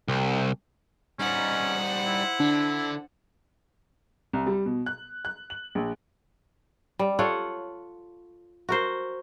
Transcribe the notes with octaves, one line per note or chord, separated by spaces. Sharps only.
C2
G3 C#4 D#4 C5 F#5
E4
D3 D4
C2
G3
B2
F#6
F#6
F#7
A#1
G3
F4 A4 C#5 F#5
F#4 A#4 C5